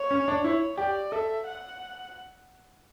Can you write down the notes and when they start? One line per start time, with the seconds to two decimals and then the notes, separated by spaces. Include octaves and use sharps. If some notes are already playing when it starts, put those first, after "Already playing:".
Already playing: C#5
0.11 C#4
0.28 D4
0.44 E4 C#5
0.77 G4 D5
1.12 A4 E5
1.46 F#5